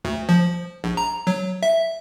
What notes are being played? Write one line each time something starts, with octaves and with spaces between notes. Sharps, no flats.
D2
F3
A#1
A#5
F#3
E5